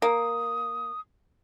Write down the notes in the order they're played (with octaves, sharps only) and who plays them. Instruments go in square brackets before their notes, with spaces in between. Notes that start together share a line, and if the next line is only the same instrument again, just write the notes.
[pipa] A#3 [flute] D#6